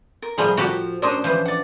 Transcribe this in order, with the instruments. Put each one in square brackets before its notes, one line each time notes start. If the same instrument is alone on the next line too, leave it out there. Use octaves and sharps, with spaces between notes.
[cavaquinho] A#4
[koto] A2 F3 G3 [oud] G#4
[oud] F3 [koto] F#4 G4 A4
[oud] C#4 D4 [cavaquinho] A#4 C5 D#6
[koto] E3 F3 [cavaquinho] C5
[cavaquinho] D5 F#5